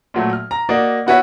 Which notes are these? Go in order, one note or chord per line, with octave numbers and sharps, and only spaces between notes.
A#2 F#3 A3
F6
A#5
A#3 F#4 D5 D#5
B3 E4 F#4 B4 C#5 E5